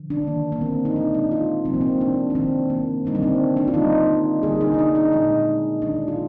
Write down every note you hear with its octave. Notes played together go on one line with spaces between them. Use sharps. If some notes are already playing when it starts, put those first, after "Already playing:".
Already playing: D3 F3
D4
D#3 A#3
A#3
C4
D#4
A#2 G#3 D4
D#4
F4
C3 F3 G#3 C4
A#3
C4
D4
D4
D#3 G#3 C4
A#3
D3 G3 A#3 D#4
D4
C4
D4
F4
D3 G3 A#3 D#4
D3 G3 A#3 G#4
D#4
D4
D#4
D#4
A#2 G#3 D#4
D#3 G#3 D4
F4